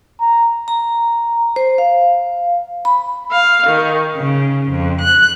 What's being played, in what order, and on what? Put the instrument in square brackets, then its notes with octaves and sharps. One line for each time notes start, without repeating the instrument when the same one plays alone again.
[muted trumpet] A#5
[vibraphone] A#5
C5
F5
B5
[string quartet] F5
D#3
C#3
F2
F#6